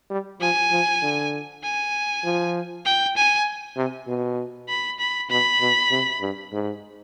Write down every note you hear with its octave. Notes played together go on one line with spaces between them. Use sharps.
G3
F3 G#5
F3
D3
G#5
F3
G5
G#5
C3
B2
B5
B5
B2 B5
B2
C3
G2
G#2